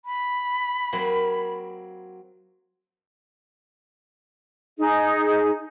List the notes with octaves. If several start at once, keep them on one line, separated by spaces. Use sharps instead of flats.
B5
F#3 A#3 C4
D#4 G#4